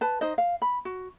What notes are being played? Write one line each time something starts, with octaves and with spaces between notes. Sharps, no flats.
B4 A5
D#4 C5 D#5
F5
B5
F#4